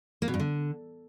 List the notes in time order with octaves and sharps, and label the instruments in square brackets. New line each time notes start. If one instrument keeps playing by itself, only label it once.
[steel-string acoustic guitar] A#3
B2
G2
D3